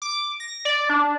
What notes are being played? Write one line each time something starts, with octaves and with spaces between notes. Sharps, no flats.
D6
A#6
D5
D4